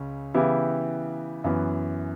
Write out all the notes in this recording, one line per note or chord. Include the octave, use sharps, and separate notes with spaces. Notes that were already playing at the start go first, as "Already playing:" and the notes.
Already playing: C#2 C#3 C#4
C#3 E3 B3 E4 G4
F#2 E3 B3